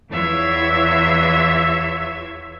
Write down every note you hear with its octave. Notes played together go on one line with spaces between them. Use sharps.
E2 E3 F4 C#5 E5 G#6